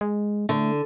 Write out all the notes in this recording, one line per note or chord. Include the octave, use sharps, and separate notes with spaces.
G#3
D3 A3